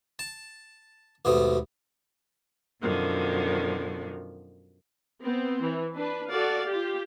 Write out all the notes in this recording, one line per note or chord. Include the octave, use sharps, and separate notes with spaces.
A5
D#2 G#2 B2 A3 B3
F#2 B2 D3 D#3 F3
B3 C4
E3
D4 B4
F#4 A4 D5 F5
F4 G4